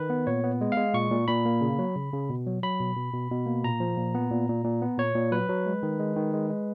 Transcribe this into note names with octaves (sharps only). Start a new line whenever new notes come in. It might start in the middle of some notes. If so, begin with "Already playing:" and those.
Already playing: D#3 B4
B3
A#2 C#5
B3
G#3
F5
G#3
A#2 C#6
A#2
A#2 B5
A#3
C#3
F#3
C#3
C#3
B2
F#3
F#3 B5
B2
B2
B2
B2
A#3
A#2 A#5
F3
A#2
B3
A#2
A#2
A#2
B3
A#2 C#5
A#2
F#3 B4
F#3
G#3
D#3
G#3
D#3
G#3
G#3